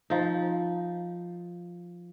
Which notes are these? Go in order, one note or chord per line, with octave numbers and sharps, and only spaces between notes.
F3 D#4